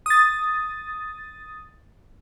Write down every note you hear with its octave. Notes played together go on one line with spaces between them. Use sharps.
D#6 A6